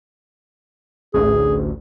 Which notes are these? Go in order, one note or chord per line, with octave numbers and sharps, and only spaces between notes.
A1 D2 G#4